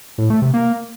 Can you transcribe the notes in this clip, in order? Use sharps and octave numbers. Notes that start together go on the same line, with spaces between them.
A2
A3
C3
A#3